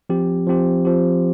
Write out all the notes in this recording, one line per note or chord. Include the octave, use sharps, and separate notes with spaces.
F3 C4 G4
F3 C4 G4
F3 C4 G4